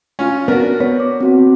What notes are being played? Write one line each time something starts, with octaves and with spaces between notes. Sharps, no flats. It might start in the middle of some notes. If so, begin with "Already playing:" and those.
C#4 F4
B3 D4 F#4 A#4
B3 C#5
D6
C4 F#4 F#5